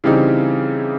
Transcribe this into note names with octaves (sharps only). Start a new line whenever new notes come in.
C#3 E3 G3 C4 D#4